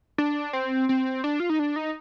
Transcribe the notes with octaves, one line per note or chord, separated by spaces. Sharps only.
D4
C4
C4
D4
F4
D#4
D4
D#4